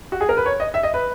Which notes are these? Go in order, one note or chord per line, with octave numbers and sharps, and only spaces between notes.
F#4
G#4
A#4
B4
C#5
D#5
E5
D#5
B4